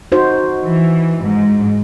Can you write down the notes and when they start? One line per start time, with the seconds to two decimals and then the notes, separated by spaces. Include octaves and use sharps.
0.12 D#4 F#4 C5
0.65 E3
1.23 G#2